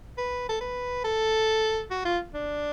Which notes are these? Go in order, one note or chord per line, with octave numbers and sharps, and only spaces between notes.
B4
A4
B4
A4
F#4
F4
D4